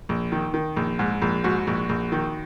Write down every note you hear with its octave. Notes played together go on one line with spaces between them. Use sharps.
A#1
D#3
D#3
A#1
G#2
A#1
G#2 F#4
A#1
A#1
D#3